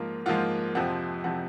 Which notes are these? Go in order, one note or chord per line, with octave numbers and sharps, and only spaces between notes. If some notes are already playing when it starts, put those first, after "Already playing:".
Already playing: G#2 F3 A#3 F4
G#2 F3 A#3 F4 F#5
F2 C3 F3 C4 F#5
C3 F3 C4 F#5